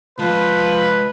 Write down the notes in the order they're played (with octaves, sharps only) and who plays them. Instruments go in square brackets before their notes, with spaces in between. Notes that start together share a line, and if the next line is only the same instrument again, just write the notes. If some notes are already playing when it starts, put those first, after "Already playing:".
[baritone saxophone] F3 [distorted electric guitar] G#3 F5 [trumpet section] B4